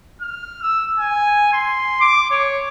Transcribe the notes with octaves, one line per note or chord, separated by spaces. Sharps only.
F6
E6
G#5
C6
D6
C#5